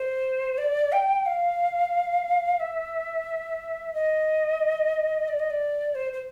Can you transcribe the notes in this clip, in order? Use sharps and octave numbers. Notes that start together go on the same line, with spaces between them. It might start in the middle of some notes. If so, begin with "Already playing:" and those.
Already playing: C5
D5
G5
F5
E5
D#5
D5
D#5
D5
C5
C5